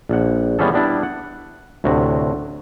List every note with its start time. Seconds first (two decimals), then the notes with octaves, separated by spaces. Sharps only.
0.09 A#1 F#5
0.59 E3 G3 B3 C#4 G#4 A4
0.73 G3 B3 D4 E4 D5
1.03 F#5
1.84 D2 A2 C3 F#4